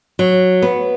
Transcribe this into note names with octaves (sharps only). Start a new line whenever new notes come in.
F#3
B3